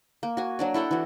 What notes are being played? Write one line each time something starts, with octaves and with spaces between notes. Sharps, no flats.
A#3
F#4 G#5
F#3 D4 D5
E4 A4 F#5 G5
E3 F#4